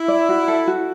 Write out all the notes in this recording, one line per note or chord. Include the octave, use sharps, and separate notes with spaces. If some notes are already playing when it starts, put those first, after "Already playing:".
Already playing: E4
D5
F#4
A4
F#4